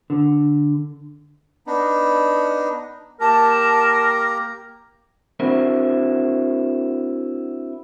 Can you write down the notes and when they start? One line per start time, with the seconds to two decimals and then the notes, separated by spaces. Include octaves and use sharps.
0.10 D3
1.67 B3 D4 D#4
3.21 A#3 G4 A#4 A5 A#5
5.40 C4 D4 E4 F#4 A#4 C5